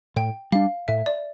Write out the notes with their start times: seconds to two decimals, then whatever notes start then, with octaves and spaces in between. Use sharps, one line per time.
0.16 A2 G5
0.52 G3 D4 F5
0.88 A2 E5
1.06 D5